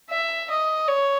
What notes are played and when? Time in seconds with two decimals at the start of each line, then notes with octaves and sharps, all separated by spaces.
0.10 E5
0.49 D#5
0.88 C#5